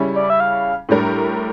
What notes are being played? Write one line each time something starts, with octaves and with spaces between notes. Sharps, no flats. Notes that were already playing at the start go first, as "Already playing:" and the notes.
Already playing: C#3 G3 C#4 E4
D5
E5
F5
A2 G3 D4 G4 A#4